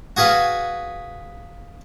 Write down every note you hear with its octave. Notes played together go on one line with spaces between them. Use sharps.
F#4 G#4 B4 F5